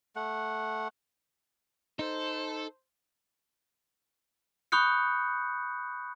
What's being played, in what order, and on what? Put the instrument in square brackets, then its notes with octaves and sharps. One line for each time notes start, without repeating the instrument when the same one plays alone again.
[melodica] A3 F#5
[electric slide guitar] D#4 [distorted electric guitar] A4 [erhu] C5
[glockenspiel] B5 C#6 D#6 F#6 G6 C#7